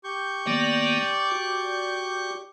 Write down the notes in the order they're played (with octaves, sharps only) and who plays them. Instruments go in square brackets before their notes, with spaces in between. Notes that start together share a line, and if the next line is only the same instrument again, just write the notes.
[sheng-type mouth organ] G4 C#6 G6
[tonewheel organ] D#3 A#3 B3 [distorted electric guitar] D5
[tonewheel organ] F#4